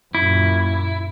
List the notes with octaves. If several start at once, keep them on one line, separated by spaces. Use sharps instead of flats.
F#2 A#2 E4